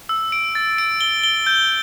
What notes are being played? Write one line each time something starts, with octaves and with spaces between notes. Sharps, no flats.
E6
D7
A6
D7
G7
G7
G6